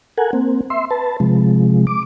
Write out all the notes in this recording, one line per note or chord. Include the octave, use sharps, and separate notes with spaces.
A4 A#4 F#5 G#5
A#3 C4
E5 C6
B4 A5
C3 F3 G#3
D6